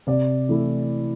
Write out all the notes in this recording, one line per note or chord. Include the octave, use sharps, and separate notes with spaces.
C3 D5
E3 A3 E4